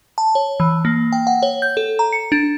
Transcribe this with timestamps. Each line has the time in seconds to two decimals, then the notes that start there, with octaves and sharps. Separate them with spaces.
0.18 A5
0.35 C#5
0.60 E3
0.85 A#3
1.12 G5
1.27 F#5
1.43 C#5
1.62 G6
1.77 A4
1.99 A#5
2.13 C#7
2.32 D4